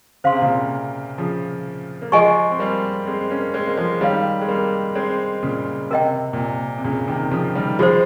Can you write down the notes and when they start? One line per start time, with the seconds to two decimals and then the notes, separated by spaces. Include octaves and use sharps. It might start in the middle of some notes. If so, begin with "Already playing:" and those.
0.24 C#3 C5 F5 C6
0.32 C3
0.42 A#2 C#3
1.18 C#3 F3
2.02 A#3
2.12 F3 G#3 G#4 D#5 G#5 C#6
2.51 C4
2.59 G3 A#3
3.07 G#3 C4
3.30 A#3 C#4
3.54 G#3 C4
3.67 A#3
3.77 F3 G#3
4.01 D#3 G3 G#4 C#5 F5
4.42 G#3
4.48 G3 A#3
4.95 G#3 C4
5.43 A#2 C#3
5.91 C3 A#4 D#5 G5
6.33 A#2
6.38 C3
6.78 C3
6.84 A#2 C#3
7.08 C3 D#3
7.31 C#3 F3
7.55 D#3 G3
7.79 F3 G#3 F4 G#4 C5